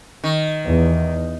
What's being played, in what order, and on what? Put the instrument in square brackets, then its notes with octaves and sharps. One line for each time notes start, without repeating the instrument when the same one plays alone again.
[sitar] D#3
[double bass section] E2